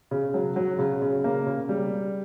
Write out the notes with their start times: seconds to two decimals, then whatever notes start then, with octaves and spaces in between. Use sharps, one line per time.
0.11 C#3
0.34 F#3
0.56 F#3
0.79 C#3
1.02 C#3
1.24 A#3
1.46 C#3
1.69 G3